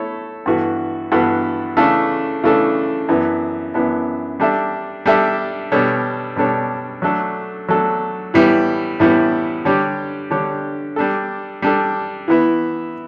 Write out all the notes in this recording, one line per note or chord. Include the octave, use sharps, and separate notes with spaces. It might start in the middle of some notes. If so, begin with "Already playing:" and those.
Already playing: A3 E4 A4 C#5
G2 E3 B3 F#4 A4
G2 E3 B3 F#4 A4
C#3 E3 A3 D4 A4
C#3 E3 A3 D4 A4
F#2 E3 B3 D4
F#2 E3 B3 D4
G3 D4 A4 E5
G3 D4 A4 E5
B2 G3 D4 A4 C#5
B2 G3 D4 A4 C#5
F#3 A3 D4 A4
F#3 A3 D4 A4
A2 E3 G3 B3 E4
A2 E3 G3 B3 E4
D3 G3 D4 G4 C#5
D3 G3 D4 G4 C#5
G3 D4 A4
G3 D4 A4
E3 B3 E4